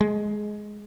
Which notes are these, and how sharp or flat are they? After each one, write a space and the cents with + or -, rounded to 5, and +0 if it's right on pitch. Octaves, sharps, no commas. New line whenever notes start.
G#3 +10